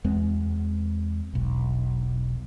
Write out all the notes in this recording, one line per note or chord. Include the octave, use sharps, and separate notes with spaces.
E2 G#3 C4
E1 B1